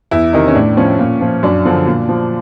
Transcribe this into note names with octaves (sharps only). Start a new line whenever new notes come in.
E2 E4
C3 D#3 D#4
C#4
A2 D4
F3 C#4
A#2
F3
F#2 D4
D3 F3
A#2
F3